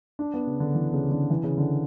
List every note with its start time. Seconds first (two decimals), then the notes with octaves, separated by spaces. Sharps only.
0.19 D4
0.34 B3
0.47 C#3
0.60 D3
0.75 E3
0.93 C#3
1.11 D3
1.30 E3
1.44 C#3
1.58 D3